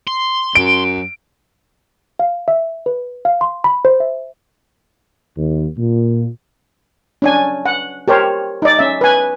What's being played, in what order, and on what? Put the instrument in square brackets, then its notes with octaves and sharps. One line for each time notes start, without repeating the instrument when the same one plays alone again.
[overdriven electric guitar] C6
[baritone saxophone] F#2 [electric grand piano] D7
[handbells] F5
E5
B4
F5
C6
B5
C5
E5
[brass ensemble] D#2
A#2
[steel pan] C#4 D4 G#5
F#5
G4 A#4 C5 C#5
D#4 D5
C#4 E5
B4 G#5